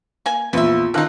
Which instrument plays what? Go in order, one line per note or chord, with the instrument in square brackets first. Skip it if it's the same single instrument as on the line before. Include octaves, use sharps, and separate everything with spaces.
[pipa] A#3 G#5
[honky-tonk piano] A#1 [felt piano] E2 F4 [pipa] B4 E5
[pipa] B2 D#4 [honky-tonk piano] D#3 F4 [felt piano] A5 E6 F#6